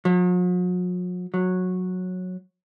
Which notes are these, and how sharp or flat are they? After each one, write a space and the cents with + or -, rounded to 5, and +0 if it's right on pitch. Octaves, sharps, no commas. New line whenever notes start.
F#3 -45
F#3 -15